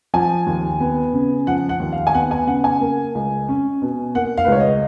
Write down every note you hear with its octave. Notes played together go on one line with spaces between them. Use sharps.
F3 G#5
D#2
B3
C#3
F3 F#5
F#5
D#2
F5
G#5
B3 F#5
G#5
C#3 F#5
G#5
A#3
C#2
C#4
B2
A#3 F#5
F5
B4
C#2 C#5
D#5